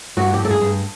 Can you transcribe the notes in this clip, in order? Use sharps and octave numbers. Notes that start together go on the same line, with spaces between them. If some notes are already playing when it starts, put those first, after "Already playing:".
G2 F#4
G4
G2
A4
G#4
G2